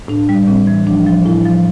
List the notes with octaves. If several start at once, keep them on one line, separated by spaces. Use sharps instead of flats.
A2 D4
G3
A2 C4
E3
F3 D4
F3
A2 E4
F3